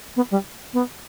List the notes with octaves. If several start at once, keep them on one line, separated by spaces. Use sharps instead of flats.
B3
G3
B3